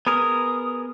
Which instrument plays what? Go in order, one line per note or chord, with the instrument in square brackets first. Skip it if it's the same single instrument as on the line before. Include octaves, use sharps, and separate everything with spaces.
[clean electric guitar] B3 G#4 A#4 [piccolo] D#6